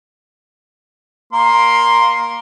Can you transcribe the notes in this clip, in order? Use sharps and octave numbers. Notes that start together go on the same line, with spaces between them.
A#3 A#4 C6